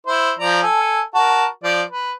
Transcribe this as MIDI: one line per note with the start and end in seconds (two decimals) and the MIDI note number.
0.07 0.33 64
0.07 0.33 72
0.39 0.62 53
0.39 0.62 74
0.39 0.62 82
0.62 1.01 69
0.62 1.01 80
1.14 1.46 66
1.14 1.46 70
1.14 1.46 81
1.64 1.82 53
1.64 1.82 74
1.90 2.12 71